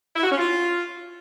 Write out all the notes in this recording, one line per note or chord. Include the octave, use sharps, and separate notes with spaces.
E4
F#4
C#4
F4